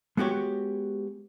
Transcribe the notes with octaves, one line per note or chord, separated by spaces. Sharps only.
G#3 B3 F#4 G4 C#5